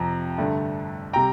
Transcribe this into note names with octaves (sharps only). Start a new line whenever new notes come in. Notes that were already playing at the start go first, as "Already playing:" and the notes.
Already playing: F2 C3 F3 A#5
G2 D3 A3
C3 G3 G5 A#5